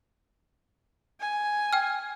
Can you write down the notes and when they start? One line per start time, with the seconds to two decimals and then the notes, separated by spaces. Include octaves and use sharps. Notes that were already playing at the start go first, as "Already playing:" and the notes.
1.20 G#5
1.73 G5 F6